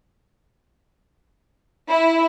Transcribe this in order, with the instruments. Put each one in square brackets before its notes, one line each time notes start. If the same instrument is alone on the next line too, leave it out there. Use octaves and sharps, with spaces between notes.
[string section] E4